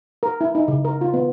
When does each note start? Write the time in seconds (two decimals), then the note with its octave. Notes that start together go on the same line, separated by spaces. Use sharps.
0.23 A#4
0.41 E4
0.55 D#4
0.68 C#3
0.85 A#4
1.01 F4
1.14 B3